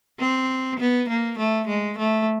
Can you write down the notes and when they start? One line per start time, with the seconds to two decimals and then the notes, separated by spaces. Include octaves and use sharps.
0.20 C4
0.79 B3
1.09 A#3
1.38 A3
1.68 G#3
1.98 A3